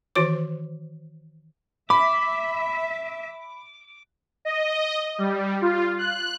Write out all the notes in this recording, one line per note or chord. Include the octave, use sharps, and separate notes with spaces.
D#3 E3 F#4 C#5 D6
E5 B5 D6
D#5
G3
F4
F#6